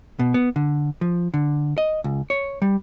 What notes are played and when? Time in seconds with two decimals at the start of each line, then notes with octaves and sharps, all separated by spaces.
0.19 B2
0.34 B3
0.56 D3
1.01 F3
1.34 D3
1.78 D#5
2.04 C#2
2.30 C#5
2.62 G3